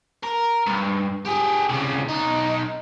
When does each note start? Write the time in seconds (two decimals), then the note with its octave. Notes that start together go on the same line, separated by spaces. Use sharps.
0.23 A#4
0.67 G2
1.25 G4 G#4
1.69 C2 C#3
2.09 B1 D#4